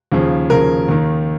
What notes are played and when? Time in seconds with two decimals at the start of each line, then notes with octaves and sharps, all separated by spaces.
0.12 D#2 C#3 F3
0.50 D#2 C#3 F3 A#4
0.88 D#2 D#3